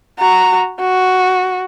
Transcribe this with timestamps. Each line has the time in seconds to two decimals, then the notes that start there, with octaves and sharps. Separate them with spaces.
0.19 F#4 A#5
0.80 F#4